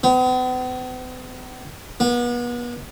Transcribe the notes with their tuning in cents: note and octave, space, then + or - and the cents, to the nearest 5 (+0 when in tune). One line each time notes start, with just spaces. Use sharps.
B3 +45
B3 -35